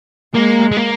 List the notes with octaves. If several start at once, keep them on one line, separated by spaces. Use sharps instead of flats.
G#3 A#3
G#3
A#3